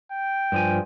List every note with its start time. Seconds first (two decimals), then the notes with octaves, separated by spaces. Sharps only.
0.12 G5
0.52 G2 F3 G#5